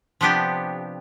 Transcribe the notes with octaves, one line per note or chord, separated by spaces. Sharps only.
C3 F3 B3 D4 G4